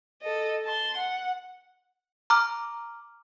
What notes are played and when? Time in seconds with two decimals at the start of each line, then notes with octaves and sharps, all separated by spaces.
0.22 A4 D#5
0.65 A5 C6
0.98 F#5
2.30 A#5 D6 F6